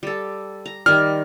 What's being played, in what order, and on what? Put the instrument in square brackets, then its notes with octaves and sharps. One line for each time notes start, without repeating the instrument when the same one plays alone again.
[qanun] G3 A4
A#5
[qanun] D#3 G3 [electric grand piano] F6